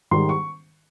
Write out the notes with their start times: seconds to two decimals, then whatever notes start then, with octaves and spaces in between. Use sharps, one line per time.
0.11 G#2 D#3 G3 C6
0.29 C#6